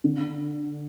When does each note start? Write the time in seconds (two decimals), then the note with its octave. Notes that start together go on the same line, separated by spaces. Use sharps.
0.04 D3